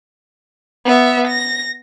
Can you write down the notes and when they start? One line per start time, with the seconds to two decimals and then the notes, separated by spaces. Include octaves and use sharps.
0.85 B3 E5
1.27 A#6